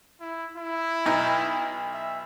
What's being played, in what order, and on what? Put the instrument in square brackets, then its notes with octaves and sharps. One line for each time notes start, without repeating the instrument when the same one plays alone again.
[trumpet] E4
E4
[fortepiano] B1 D#4
[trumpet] E5